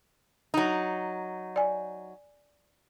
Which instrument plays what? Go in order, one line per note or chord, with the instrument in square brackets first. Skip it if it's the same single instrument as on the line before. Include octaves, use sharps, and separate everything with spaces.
[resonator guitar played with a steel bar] F#3 D#4
[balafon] D5 G#5